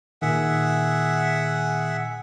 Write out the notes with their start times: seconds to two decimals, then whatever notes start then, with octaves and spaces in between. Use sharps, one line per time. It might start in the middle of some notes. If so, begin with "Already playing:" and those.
0.22 A#2 D#3 G#4 E5 F#5